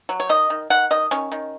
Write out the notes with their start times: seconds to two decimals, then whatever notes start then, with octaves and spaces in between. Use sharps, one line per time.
0.09 F#3
0.20 C#5
0.29 D#3 D#5
0.50 D#3
0.70 D#3 F#5
0.91 D#3 D#5
1.11 D#3 C#4
1.32 D#3